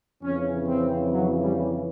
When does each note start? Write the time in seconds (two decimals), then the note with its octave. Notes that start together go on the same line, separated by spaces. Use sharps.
0.22 F2 C#3 E3 C#4
0.67 C4
1.12 F#3
1.43 G3